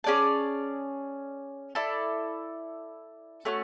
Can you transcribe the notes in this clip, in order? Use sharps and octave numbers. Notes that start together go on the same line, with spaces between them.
C#4 G#4 D5 A5
E4 A4 D5
A3 C#4 F#4